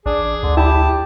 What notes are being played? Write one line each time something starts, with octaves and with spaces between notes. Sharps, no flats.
A1 D4 G#4
D2 D3
E4 G4 A5 B5